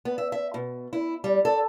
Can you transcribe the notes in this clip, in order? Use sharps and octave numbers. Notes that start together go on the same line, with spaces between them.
B3
E5
E5
B2
E4
G3
A4